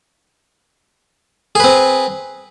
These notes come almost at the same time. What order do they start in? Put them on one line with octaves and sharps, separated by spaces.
G#4 B4 C4